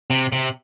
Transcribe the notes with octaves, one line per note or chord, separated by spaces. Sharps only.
C3
C3